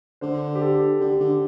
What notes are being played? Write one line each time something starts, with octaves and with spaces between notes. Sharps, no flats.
D3 C5
G4
A4
D3 G4
D3